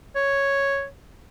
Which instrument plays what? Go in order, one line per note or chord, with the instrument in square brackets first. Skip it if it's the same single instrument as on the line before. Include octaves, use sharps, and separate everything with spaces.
[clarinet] C#5